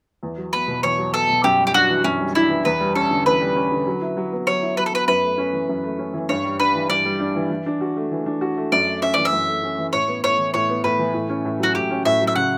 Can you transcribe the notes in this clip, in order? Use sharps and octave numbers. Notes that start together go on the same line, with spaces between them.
E2
F#3
B3 B4
B2
E2 C#5
F#3
B3 A4
B2
F#2 G4
G3
G4
D4 F#4
E3
F#2 C#4
G3
D4 E4
E3
E2 B4
G3
C#4 A4
D3
E2 B4
G3
C#4
D3
F#3
E4
F#3
B3
F#3 C#5
E4
F#3 B4
A4
B3 B4
F#2 B4
A3
C#4
E3
F#2
A3
C#4
E3
G2 C#5
G3
D4 B4
E3
G2 D5
G3
D4
E3
E3
D4
F#4
A3
E3
D4
F#4
A3
F#2 D5
A3
C#4 E5
E3 D5
E5
F#2
A3
C#4
E3
A2 C#5
B3
A2 C#5
E3
A2 C#5
B3
A2 B4
E3
A2
C#4
A2
F#3 F#4
A2 G4
C#4
A2 E5
F#3
E5
C#3 F#5